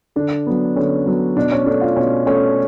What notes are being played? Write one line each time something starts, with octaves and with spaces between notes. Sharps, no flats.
D3 D4
F#3 B3
D3 C#4
F#3 B3
B2 D4
C#4
A3 D4
F4
B2 C#4
A3 C#4